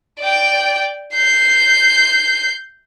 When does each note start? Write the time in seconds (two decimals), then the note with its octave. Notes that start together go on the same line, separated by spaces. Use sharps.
0.20 D5 G5
1.14 G6 C7